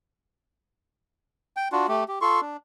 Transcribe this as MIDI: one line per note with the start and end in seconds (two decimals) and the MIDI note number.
1.57 1.68 79
1.72 1.87 62
1.72 1.87 65
1.72 1.87 66
1.88 2.04 57
1.88 2.04 67
2.08 2.19 67
2.21 2.41 65
2.21 2.41 69
2.21 2.41 84
2.21 2.41 85
2.41 2.57 62